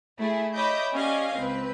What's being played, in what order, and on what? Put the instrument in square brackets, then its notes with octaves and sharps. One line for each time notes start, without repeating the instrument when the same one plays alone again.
[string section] A3 E4 G#4
C#5 D#5 E5 B5 D6 G6
C#4 G4 D5 D#5 F5 G#5
C#2 C4 B4